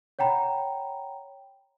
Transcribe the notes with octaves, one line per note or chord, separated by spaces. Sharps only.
C#5 F#5 G5 A#5 B5